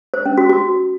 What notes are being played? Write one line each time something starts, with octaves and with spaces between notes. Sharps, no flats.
C5
C#4
F#4
F#4